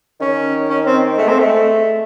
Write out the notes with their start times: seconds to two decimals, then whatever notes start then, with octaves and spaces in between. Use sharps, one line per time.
0.20 D#3 C#4
0.69 C#4
0.86 C4
1.18 G#3 A3
1.28 C4
1.39 G#3 A3